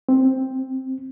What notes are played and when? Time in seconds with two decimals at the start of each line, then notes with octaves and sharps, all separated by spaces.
0.09 C4